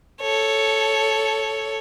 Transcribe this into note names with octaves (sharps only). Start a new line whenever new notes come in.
A4 C#5